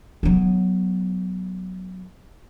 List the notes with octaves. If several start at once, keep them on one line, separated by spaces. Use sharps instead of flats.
F#3 B3